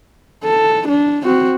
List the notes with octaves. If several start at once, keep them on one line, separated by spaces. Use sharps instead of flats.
A4
D4
C4 F#4